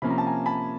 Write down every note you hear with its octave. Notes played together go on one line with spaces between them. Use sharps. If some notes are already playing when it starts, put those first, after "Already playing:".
C3 F3 A#3 C#4 B5
A#5
A5
G#5 A#5
A5 B5